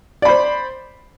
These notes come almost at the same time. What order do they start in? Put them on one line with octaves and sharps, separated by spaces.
D5 B5 C5